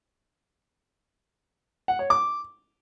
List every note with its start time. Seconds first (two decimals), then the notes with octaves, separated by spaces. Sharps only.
1.88 F#5
1.99 C#5
2.10 D6